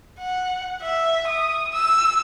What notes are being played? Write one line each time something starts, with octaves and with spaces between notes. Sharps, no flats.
F#5
E5
D#6
E6